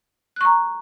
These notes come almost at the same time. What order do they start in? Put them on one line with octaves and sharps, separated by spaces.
F#6 C#6 A#5